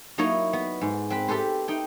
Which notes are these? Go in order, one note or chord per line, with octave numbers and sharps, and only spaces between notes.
F#3 A#3 D#4 E4 C#5
B3
G#2
C4 B4 B5
G4 A4 B4 C5
D#4 G5